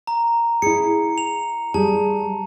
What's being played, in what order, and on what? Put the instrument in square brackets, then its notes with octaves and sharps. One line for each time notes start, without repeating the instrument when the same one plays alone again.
[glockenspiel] A#5
[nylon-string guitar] E4 G#4 [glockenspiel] C#7
[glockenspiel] F7
[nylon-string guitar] G3 G4 G#4 [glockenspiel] A5